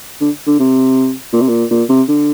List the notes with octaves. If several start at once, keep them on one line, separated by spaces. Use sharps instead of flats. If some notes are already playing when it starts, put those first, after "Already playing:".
D3
D3
C3
A#2
C3
A#2
A#2
C3
D3